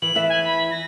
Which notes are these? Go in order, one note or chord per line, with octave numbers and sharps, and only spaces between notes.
E3 F#7
E2 E3 E5
G#5
B5
A#6